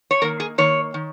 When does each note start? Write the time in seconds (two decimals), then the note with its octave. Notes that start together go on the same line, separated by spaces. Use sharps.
0.11 C#5
0.22 D#3 A#3 A#4
0.40 G#4
0.58 D#3 A#3 C#5
0.94 D#3